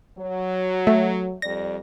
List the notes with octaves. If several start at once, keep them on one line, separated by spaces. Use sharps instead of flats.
F#3
A3
F2 G3 D5 A#6